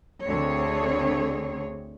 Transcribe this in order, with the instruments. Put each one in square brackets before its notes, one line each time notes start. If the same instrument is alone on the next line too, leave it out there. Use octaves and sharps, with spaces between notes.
[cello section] D2 D3 C4 G#4 C#5